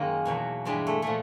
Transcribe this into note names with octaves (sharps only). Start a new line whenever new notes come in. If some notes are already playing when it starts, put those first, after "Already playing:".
Already playing: F#2 D#3 G#3 A#3
E2 B2 F#3
G2 E3 G3 G#3
A3
A#2 F3 A3